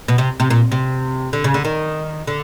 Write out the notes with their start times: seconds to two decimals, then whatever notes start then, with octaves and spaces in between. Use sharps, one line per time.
0.08 B2
0.18 C3
0.40 C3
0.50 A#2
0.72 C3
1.33 D3
1.44 C#3
1.54 D3
1.65 D#3
2.27 D3